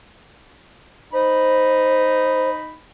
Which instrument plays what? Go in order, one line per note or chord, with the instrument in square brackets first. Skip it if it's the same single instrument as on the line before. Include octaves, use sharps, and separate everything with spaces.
[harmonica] D#4 B5 [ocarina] C5